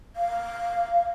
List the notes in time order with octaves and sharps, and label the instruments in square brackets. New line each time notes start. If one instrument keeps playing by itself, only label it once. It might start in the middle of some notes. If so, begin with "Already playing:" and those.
[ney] F5